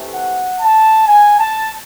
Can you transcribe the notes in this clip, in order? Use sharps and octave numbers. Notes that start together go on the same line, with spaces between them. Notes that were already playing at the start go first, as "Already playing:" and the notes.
Already playing: C3 E3 A3
F#5
A5
G#5
A5